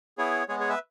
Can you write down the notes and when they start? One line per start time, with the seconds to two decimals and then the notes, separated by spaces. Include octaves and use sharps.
0.18 B3 E4 G#4 C#5
0.49 G#3 B3 G#4 C#5
0.60 G#4 C#5
0.69 B4 E5